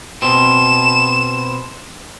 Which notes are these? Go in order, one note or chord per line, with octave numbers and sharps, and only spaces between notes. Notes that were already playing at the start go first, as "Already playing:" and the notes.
B2 C4 E7